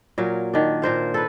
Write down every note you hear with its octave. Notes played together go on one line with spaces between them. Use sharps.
A#2 F#3 A#4 F5
D#3 D4
A#2 A#4 C5 F5
A4 B4